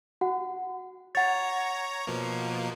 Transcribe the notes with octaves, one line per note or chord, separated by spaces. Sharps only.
F#4 F#5
C#5 F#5 A#5 A6
B2 F3 A#3